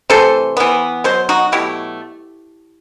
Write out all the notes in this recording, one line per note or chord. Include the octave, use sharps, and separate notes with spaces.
C3 E3 A3 A4 C5
E3 B3
B2 F#3 C5
D#4 F#4
B2 F#3 A3 E4 G4